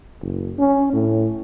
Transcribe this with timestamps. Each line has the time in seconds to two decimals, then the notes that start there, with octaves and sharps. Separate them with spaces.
0.22 F#1
0.58 C#4
0.93 A2